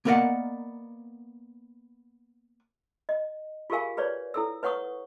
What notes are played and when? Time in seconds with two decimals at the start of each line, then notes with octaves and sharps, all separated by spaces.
0.05 A#3 B3 A#4 D5 D#5 F#5
3.09 D#5
3.70 F4 G4 G#4 A#4 F5 G#5
3.97 G#4 B4 C#5 D5
4.34 E4 A4 E6
4.63 B4 C#5 F#5 C#6 D#6